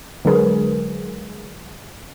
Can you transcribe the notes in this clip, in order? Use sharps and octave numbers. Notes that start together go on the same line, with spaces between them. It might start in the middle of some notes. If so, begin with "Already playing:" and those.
D3 F#3 G#3 G#4 A#4 B4